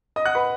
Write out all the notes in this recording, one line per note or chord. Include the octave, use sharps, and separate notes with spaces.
D#5 D#6
F#5 F#6
B4 B5